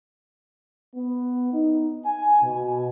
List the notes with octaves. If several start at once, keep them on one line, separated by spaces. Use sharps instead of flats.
B3
D#4
G#5
B2